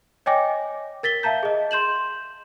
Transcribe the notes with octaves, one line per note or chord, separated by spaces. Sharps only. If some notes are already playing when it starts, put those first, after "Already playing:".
C#5 D#5 G5 G#5 D6 A#6
A#4 A6 B6 G7
E5 F5 A5 A#5 G6
G#4 D#5
C6 G6 E7 F#7